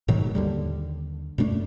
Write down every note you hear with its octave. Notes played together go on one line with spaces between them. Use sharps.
G#2 B2 D#3 F#3
D#2 D3 G3
F#2 B2 A3 D4